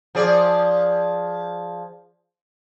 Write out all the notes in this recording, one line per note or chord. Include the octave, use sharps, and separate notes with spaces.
F3 G#4 D5